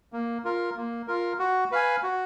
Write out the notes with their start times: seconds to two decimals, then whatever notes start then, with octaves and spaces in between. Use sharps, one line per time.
0.13 A#3
0.44 F4 A#4
0.77 A#3
1.08 F4 A#4
1.39 F#4
1.72 B4 F5 G#5
2.03 F#4